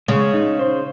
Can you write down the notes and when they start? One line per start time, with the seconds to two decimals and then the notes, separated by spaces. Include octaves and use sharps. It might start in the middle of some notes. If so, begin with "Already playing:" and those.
0.08 C#3 G#3
0.34 D#4
0.59 C5